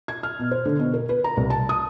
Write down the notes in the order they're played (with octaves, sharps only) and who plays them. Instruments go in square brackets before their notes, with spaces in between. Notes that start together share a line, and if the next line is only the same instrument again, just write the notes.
[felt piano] G#6
F6
B2
C5
D3
B2
A#4
B4
A#5
C2
A5
D#6